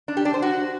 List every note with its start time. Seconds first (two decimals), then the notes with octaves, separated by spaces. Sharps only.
0.08 D4
0.17 G4
0.25 D4
0.34 C5
0.42 F#4